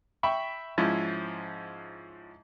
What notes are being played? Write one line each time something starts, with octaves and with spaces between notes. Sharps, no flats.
E5 G5 B5 C#6
G#2 F3 C#4 E4